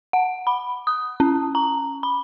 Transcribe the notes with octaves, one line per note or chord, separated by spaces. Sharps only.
F#5
B5
D#6
C#4
A#5
B5